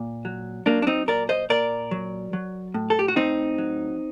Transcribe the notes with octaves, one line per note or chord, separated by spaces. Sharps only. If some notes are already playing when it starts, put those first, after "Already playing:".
Already playing: A#2
F#3
F#3 A#3 D4
D4
C4 D#4
A#2 A#4 D5
C5 D#5
A#2 A#4 D5
F#3
F#3
A2
A4
G4
F#4
A2 C4 D#4
F#3